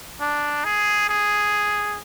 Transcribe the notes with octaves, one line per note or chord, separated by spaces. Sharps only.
D4
G#4
G#4